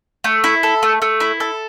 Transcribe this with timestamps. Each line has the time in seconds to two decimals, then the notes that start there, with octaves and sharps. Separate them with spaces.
0.24 A3
0.44 E4
0.63 A4
0.83 A3
1.02 A3
1.20 E4
1.40 A4